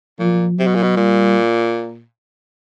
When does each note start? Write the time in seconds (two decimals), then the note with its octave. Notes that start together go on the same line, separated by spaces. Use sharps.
0.20 A#2 F3
0.58 C3 F#3
0.67 B2
0.75 A#2
0.83 B2
0.97 A#2 G3